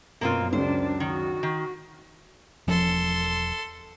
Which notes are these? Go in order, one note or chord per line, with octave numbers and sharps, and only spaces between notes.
F#2 B2 A#3 C4 F4 A#4
C#2 F#2 D4 C5
D#3 F#4
D#3
E1 F3 C#4 A4 C6